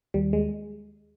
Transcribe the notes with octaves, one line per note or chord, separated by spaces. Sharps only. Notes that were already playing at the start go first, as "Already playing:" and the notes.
D#2 G3
G#3